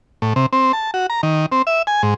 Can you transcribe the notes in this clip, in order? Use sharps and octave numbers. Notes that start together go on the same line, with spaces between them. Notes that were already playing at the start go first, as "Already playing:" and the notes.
A2
C3
C4
A5
F#4
A#5
D#3
C4
E5
G#5
G#2